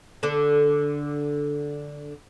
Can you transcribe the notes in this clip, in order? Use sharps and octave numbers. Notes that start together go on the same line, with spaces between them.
D3 D4